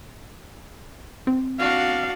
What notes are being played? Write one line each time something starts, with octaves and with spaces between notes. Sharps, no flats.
C4
D4 F#4 F5